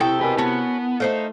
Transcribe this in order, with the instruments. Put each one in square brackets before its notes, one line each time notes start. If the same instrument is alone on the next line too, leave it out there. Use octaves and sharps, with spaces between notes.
[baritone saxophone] C3 [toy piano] E4 C#6 D#6 [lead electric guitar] A4 [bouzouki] G5
[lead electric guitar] B2 B4 [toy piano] A#4 G#5 C#6
[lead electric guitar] B3 [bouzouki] C#4 F#4 [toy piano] A5
[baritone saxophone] A3 [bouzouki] D#4 C5 F5